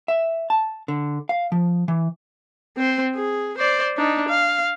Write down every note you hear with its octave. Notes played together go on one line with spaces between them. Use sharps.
E5
A5
D3
F5
F3
E3
C4 C5
G#4
C5 D5
D4 D#4
F5